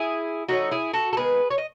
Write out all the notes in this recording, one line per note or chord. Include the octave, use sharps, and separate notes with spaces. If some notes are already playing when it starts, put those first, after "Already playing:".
Already playing: E4 G#4
E3 A3 C#4 D#4 F#4
E4 G#4
F#4 A4
A4
D#3 G#3 B3 G#4 B4
C#5
D#5